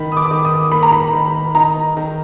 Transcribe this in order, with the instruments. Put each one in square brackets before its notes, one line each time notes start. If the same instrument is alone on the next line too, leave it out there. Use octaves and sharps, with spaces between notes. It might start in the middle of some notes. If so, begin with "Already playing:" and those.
Already playing: [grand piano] D#3 [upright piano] B5
[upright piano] D#6
D6
[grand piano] D#3
[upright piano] D#6
[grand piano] A#3 [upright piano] B5
[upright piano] A#5
B5
[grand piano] D#3
[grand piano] D#4 [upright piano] A#5
[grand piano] D#3